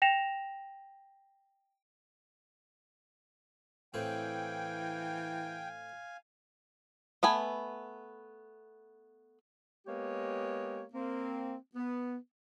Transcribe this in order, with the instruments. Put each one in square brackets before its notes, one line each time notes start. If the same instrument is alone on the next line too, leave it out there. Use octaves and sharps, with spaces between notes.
[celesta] G5 A#6 E7 F7
[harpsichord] A2 C4 [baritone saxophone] E3 [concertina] F5 G#5 [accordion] G5
[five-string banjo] A3 B3 G#5 B5
[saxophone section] G#3 A#3 B3 G4 C#5
A#3 C4
B3